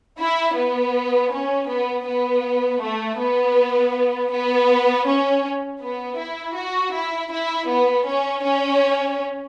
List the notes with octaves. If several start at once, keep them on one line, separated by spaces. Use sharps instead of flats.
E4
B3
C#4
B3
B3
A3
B3
B3
C#4
B3
E4
F#4
E4
E4
B3
C#4
C#4